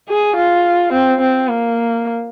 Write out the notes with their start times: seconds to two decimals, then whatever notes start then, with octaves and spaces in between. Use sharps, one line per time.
0.08 G#4
0.36 F4
0.93 C4
1.21 C4
1.49 A#3